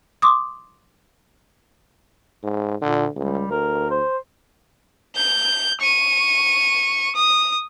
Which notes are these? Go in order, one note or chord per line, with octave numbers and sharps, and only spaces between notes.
C6 D6 D#6
G#2
A#2 D3
C#2 G3
D2 A#4
C5
G6
C#6 D#7
D#6